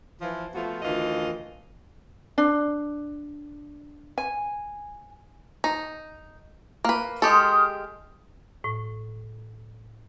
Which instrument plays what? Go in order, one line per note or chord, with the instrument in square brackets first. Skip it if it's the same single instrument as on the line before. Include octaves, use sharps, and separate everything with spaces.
[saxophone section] E3 F3
F3 A3 B3 F4 F#4
D2 D#3 E3 F4 D#5
[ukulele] D4
G#5
[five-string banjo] D#4
A#3 B4
[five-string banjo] G#3 G4 A4 [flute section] C6 D#6 F6
[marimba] A2